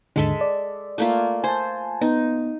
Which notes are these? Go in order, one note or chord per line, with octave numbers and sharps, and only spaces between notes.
D#2 G#2 D3 G#3 A4 E5
D5
A3 A#3 F4
C5 G#5 A5
B3 D#4